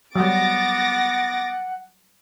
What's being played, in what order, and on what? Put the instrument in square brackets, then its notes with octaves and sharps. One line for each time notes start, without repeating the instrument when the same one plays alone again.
[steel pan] F#3 G3 [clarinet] B3 [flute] F#5 [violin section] D6 A6 A#6